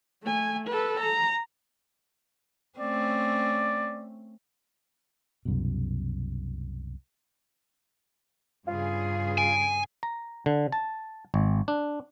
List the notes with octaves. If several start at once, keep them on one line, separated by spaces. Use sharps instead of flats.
A3 G#5
A4 B4
A#5
A3 C4 C#4 D5
C2 F#2 B2
G2 C#3 F4 G#4
G#5 D7
A#5
D3
A5
G#1
D4